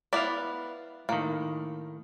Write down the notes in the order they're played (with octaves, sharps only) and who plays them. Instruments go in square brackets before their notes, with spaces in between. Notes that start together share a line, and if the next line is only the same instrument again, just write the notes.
[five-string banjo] B3 D5 [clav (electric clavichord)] E4 F5
[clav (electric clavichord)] A2 D#3 [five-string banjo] A#3